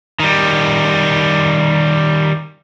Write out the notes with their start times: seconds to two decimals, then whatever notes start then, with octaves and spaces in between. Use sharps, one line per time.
0.20 D#3 G3